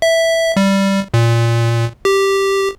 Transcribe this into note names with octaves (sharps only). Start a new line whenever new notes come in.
E5
G3
A#2
G4